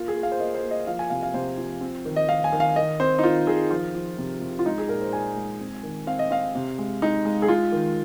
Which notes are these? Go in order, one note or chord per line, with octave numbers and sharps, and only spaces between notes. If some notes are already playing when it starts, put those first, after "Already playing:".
Already playing: A#3 F4
G#4
A#3
F5
C5
A#3 D#5
C5
A#3
D#5
F3 F5
G#5
C3 F5
F5
C3 C5
F3
C4
D#3
D#5
D#3 F5
G#5
D#3
F5
D#3 D#5
C4 C5
D#4
D#3 F4
D#3 G#4
F3 F4
F3
C3
C3
F4
G#3 D#4
G#4
A#2 A#4
C5
A#2 G#5
G#3
C4
D#3
C4 F5
D#5
C4 F5
C3
G#3
G#3 D#4
G#3
G#4
G#3 F4
D#3